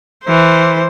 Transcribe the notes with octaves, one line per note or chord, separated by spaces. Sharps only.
E3 C5